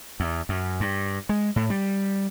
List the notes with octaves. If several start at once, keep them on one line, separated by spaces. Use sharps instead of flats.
E2
F#2
G2
G#3
A2
G3